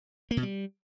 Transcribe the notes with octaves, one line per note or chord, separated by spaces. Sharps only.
A#3
B2
G3